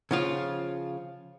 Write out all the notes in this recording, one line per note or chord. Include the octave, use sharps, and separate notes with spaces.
C#3 F3 F4